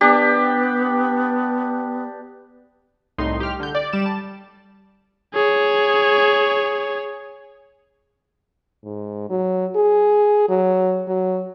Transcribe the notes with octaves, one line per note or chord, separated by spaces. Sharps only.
B3 D4 G4
C2 A2 D#4 C6
G4 F6
D3 G6
D5
G3 D6 E7
A5
G#4 C#5
G#2
F#3
G#4
F#3
F#3